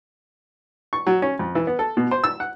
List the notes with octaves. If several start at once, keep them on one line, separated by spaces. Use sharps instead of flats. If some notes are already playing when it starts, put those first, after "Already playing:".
C#6
F#3
C#4
F2
E3
B3
A4
B2
C5
E6
F#5